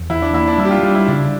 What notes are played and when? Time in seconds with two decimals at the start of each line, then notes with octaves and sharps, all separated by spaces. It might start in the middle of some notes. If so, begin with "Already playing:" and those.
Already playing: E2
0.10 E3 E4
0.22 D4
0.34 A#3 E4
0.48 D4
0.58 G3 E4
0.65 G4
0.71 F4
0.83 G3 D4
0.95 E4
1.08 C#3 D4